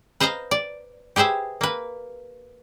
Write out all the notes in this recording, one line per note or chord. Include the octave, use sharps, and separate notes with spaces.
B4 C5 D#5 F5 A#5
D5
G4 G#4 B4 C5 E5
A#3 B4